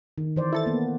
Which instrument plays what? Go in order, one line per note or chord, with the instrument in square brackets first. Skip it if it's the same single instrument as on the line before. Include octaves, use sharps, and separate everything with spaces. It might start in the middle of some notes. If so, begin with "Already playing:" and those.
[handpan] D#3
E3 C5 D5
[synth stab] E4 A4 A6
[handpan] A#3 B3